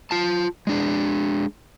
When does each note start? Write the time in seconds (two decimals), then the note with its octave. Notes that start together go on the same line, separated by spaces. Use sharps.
0.11 F4 A5
0.67 G#3 D4 G#4